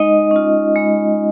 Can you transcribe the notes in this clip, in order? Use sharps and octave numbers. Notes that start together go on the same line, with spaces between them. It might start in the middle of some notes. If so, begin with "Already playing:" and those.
Already playing: G#3 D#4 D#5
C#4 F4
G#3